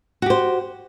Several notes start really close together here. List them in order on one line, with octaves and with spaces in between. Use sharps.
F#4 G4 C5